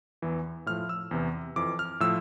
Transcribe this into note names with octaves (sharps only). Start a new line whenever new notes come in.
E2 E3
A2 F3 F6
E6
E2 C3 E3
F2 E3 D6
F6
A2 F3 E6